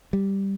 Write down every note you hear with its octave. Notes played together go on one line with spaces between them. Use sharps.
G3